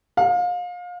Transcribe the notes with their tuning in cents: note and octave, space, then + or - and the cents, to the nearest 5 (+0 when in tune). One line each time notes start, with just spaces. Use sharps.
F5 +30